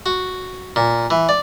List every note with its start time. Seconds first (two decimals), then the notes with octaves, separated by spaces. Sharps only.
0.06 F#4
0.76 A#2
1.10 E3
1.29 D5